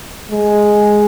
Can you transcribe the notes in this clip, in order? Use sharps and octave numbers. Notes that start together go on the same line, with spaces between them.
G#3